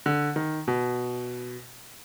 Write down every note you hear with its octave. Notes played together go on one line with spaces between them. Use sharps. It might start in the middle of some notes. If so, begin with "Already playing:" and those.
D3
D#3
B2